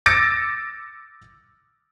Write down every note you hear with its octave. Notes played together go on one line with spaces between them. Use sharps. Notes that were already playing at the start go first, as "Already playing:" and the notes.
D6 E6 A6 A#6 C#7 D7